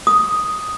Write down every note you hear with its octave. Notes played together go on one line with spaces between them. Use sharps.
D#6